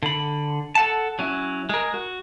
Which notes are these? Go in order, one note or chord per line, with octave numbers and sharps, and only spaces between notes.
D3 B5
A4 F#5 A5
F#3 C#4 E4
G#3 A#4
F#4